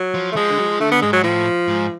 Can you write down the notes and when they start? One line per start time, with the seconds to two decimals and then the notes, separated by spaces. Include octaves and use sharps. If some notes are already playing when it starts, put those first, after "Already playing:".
Already playing: F#3
0.14 F3
0.32 A3
0.36 F3 G#3
0.50 D3
0.58 F#3
0.66 F3
0.80 D3 A3
0.91 B3
1.02 G#2 G#3
1.13 F#3
1.23 A2 F3
1.68 G#2